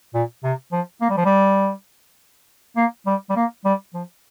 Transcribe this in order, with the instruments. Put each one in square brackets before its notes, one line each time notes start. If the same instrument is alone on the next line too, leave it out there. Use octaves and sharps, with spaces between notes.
[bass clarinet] A#2
C3
F3
A#3
G3
F3
G3
A#3
G3
G3
A#3
G3
F3